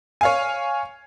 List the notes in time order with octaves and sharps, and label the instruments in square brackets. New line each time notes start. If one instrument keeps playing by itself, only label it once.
[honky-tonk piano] C#5 F5 G#5